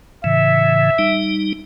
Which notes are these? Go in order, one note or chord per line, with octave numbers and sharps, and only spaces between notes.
A2 C#3 E3 E5
G3 D#4